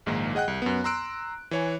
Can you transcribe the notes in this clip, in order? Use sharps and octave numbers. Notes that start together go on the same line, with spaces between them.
A#1 G#2 D#3 A#3
G#4 D#5 F#5 G5 F#6
C2
F#2 B3
A#5 C6 E6 F#6 D7
E3 C#5 G#5